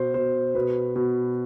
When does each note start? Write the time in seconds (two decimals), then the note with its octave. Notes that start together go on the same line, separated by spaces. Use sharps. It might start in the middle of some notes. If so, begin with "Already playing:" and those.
Already playing: B2 C5
0.14 B2 C5
0.55 B2 B4
0.96 B2